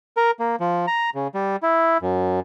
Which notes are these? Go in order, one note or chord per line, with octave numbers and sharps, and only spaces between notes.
A#4
A#3
F3
A#5
C#3
G3
E4
F#2